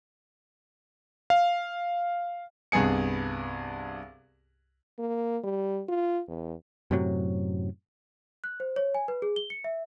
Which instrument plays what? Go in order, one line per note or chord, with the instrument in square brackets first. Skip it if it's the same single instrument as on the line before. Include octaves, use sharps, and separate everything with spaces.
[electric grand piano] F5
[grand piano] C2 G2 B3 G#4 C#7
[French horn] A#3
G3
F4
E2
[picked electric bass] F#2 A2 C3 F#3
[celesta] F#6
C5
C#5
G#5
B4
G#4
G7
C#7
E5